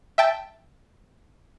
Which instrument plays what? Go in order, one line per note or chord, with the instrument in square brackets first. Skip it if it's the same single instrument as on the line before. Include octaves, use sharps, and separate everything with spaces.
[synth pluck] E5 G5 A5